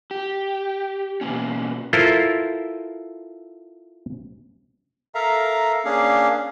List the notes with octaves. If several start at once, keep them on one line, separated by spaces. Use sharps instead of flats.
G4
B2 D#3 A#3 C#4
E4 F4 A4 A#4 C5
A4 A#4 E5 F5 A#5
A#3 C#4 D4 G#4 F5